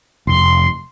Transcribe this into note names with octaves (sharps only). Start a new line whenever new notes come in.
F1 C6